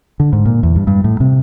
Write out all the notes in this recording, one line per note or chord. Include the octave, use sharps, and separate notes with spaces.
D3
G#2
A#2
E2
G2
G2
A2
C3